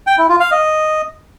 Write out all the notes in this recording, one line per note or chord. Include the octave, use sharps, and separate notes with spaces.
G5
E4
F4
F5
D#5